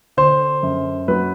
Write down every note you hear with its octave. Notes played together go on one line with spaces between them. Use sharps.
D3 C5
F#2
F#3 B4